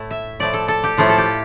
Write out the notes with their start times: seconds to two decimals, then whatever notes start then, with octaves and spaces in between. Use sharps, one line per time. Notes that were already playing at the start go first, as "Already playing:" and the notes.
Already playing: A2 A3 E4
0.11 E5
0.40 A2 F3 A3 E4 D5
0.54 A4
0.68 A4
0.84 G4
0.97 A2 F3 A3 E4 F4
1.09 A4
1.18 G4